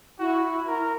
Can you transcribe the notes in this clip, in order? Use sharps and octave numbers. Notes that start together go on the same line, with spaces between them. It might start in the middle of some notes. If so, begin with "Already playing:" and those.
E4 F#4
A#4